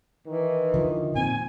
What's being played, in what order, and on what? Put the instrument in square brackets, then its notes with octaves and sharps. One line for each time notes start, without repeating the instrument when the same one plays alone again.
[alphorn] D#3 [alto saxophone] E3
[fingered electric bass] D3 F3
[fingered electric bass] A#2 C4 [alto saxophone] G#5